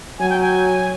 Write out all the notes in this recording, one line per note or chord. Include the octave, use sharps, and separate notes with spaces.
F#3 G#5
G5
G#5